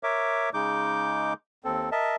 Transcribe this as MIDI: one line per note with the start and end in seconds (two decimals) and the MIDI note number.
0.03 0.50 70
0.03 0.50 73
0.03 0.50 76
0.03 0.50 86
0.54 1.33 49
0.54 1.33 56
0.54 1.33 63
0.54 1.33 86
0.54 1.33 91
1.65 1.90 39
1.65 1.90 60
1.65 1.90 69
1.92 2.16 70
1.92 2.16 75
1.92 2.16 76
1.92 2.16 81